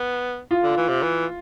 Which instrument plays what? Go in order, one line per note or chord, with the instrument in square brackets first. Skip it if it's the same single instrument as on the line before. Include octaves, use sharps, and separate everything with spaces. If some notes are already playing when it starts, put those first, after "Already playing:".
Already playing: [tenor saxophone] B3
[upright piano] F4
[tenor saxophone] D3
E3
C3
E3